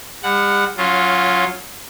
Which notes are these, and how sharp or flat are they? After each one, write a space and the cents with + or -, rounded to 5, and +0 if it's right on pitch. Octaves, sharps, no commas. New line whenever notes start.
G3 +40 F#5 +0
F#3 -20 C#4 +0 F4 +0